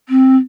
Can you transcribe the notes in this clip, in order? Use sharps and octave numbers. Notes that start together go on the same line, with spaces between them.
C4